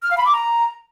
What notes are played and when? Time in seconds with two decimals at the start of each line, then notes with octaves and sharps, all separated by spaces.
0.02 F6
0.10 F5
0.18 B5
0.26 D6
0.34 A#5